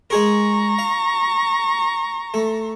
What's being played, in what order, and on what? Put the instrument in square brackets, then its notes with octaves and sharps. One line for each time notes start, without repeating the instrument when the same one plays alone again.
[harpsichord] G#3 G#4 A#4 [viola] A#5 C#6
[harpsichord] F5
A3